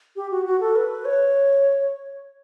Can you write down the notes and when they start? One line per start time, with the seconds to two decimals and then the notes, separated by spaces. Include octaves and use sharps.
0.16 G4
0.31 F#4
0.46 F#4
0.61 A4
0.76 B4
1.05 C#5